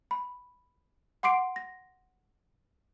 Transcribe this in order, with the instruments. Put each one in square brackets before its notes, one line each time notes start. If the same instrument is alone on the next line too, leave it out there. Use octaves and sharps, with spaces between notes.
[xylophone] B5
F#5 C6 D6 C7 D7
A#6